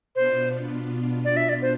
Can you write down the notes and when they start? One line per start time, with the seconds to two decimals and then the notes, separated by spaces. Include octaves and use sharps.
0.15 B2 B3 D4 F4 C5
1.24 D5
1.36 E5
1.49 D5
1.62 C5